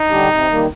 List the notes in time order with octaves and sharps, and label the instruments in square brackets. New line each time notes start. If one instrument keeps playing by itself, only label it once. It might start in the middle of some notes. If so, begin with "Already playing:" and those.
Already playing: [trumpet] D#4
[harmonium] D3 G3 D4 G4
C3
D#3 G3 A#3